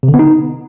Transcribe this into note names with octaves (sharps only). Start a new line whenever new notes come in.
C3
D3
B3
D#4